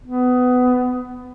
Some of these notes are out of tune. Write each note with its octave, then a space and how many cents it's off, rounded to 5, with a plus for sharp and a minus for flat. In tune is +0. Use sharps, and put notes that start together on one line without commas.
B3 +20